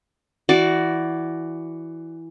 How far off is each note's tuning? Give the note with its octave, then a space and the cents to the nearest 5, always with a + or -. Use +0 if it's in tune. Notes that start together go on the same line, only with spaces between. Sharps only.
E3 +0 F#4 +15 D5 +0